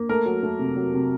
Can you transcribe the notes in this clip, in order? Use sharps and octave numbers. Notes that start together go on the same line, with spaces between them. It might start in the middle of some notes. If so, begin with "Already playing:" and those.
Already playing: A#3
A3 A#4
F#3
A3
C3
F#3
C3